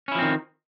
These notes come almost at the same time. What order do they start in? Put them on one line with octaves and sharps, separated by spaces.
C#4 E4 F3 C4 D#3